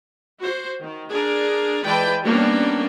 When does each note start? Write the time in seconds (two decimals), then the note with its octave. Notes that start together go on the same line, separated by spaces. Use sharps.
0.40 F#4 C5
0.82 D#3
1.11 D4 G#4 A#4
1.85 E3 G#3 B4 D5 G5 A5
2.24 G3 A#3 B3 C#4 D4